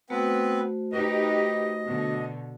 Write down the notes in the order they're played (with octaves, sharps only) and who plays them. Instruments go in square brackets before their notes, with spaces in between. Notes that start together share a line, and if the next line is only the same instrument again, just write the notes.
[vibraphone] A3 F#4 C5 [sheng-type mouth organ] B3 C4 B4
[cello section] D#4 G4 B4 [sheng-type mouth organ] D#5
[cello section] B2 D3